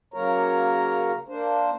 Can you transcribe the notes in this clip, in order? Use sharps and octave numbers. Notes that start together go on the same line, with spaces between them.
C#3 F#3 A#3 A#4 C#5 A#5
A#3 D4 C5